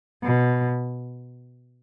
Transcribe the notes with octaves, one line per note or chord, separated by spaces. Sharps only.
B2